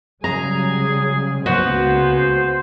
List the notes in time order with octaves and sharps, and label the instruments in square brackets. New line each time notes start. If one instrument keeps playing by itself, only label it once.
[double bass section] C#3 F#3 G3 [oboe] G#4 [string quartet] G#5 [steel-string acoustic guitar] A#5
[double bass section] C#2 A#3 [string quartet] C#3 B3 [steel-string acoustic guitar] F#4 F#5 [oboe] C5